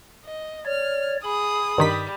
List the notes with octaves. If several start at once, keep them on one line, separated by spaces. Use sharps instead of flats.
D#5
C#5 D5 F6
G#4 B5 D#6
G2 D#3 G3 B6